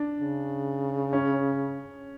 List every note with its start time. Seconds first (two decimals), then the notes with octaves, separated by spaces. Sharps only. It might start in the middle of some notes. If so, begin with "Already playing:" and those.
Already playing: D4
0.19 C#3
1.13 C#4